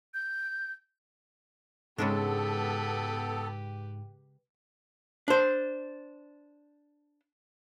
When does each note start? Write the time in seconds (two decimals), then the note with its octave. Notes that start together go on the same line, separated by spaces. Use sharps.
0.14 G6
1.98 G#2 C#3 G#3 B3 D4 G4 A4 B4
5.28 D4 C5